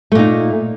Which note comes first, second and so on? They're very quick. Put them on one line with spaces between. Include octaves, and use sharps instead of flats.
A3 A#2 D#4